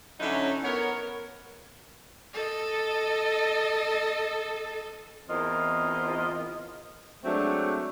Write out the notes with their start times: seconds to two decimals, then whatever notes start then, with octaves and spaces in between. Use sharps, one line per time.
0.20 D3 F#3 C#4 D#4 E4 F#4
0.63 B3 A#4 C#5
2.33 A4 D#5
5.28 E2 C4 F4 A#4 D#5
7.24 F#3 G#3 A3 C4 D4